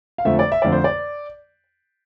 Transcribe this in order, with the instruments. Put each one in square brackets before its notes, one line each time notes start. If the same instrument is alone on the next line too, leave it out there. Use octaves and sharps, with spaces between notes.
[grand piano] F5
F2 D3 F3 A3 E5
D5
E5
F2 D3 F3 A3 D5
C5
D5